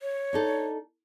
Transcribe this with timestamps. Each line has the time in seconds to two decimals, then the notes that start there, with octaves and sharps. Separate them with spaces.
0.02 C#5
0.33 D4 D#4 A4